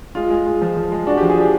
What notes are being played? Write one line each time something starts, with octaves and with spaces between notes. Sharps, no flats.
G#3 F4
G#3
G#3
F3
F3
G#3
D4 F#4
F3 G4
G#4
D4 G4